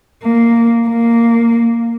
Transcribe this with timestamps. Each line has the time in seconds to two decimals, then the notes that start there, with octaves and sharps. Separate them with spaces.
0.23 A#3
0.87 A#3